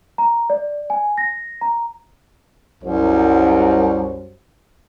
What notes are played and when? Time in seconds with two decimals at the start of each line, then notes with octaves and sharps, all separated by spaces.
0.18 A#5
0.50 D5
0.90 G#5
1.18 A#6
1.61 A#5
2.83 C2 F#2 G3 C5